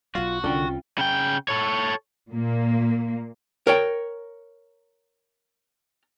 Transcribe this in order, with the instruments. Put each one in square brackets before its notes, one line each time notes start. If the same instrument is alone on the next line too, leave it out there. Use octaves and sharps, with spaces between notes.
[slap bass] B1 F#3 [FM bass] F4 [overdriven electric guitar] F#4
[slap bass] C2 [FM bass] D3 [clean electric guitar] C#4 F4 G5
[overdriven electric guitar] C#3 G5
A4 C#5
[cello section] A#2 A#3
[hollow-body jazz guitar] A#4 C#5 G5